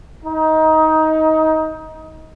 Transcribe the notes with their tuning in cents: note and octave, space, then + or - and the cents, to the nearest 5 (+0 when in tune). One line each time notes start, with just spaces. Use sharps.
D#4 +20